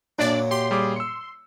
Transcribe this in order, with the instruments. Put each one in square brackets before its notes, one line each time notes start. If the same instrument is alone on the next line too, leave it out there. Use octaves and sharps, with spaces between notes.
[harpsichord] F#2 A#2 F#3 [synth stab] D4 D5
[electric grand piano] G4 [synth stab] C6
[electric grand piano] G3 G#4 D6
E6 C#7